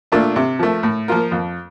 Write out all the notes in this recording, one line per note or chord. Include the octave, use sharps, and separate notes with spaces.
A#2 A3 D4 F4
C3
F3 A3
A2
F3 A#3 F4 A#4
F2